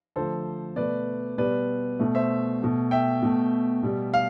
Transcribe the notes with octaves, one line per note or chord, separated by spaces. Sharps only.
D3 F3 A3 A4 C5
B2 A3 B4 D5
B2 G3 B4 D5
B2 A3
C5 E5
B2 A3
E5 G5
B2 A3
B2 G3
F5